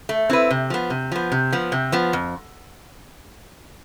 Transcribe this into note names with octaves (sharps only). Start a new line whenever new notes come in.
A3
C4 E4 B4
C3
F3 B3
C3
F3 B3
C3
F3 B3
C3
F3 B3
F2